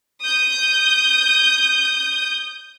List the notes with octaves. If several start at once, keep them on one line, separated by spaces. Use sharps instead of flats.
D#6 G6